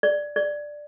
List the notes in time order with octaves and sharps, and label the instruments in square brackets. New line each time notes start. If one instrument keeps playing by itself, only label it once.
[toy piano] D5
D5